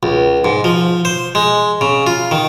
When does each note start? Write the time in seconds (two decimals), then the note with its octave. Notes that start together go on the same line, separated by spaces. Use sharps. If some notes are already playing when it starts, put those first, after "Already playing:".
0.03 C#2
0.45 G#2
0.64 F3
1.05 C5
1.35 G#3
1.81 C#3
2.07 F4
2.31 D#3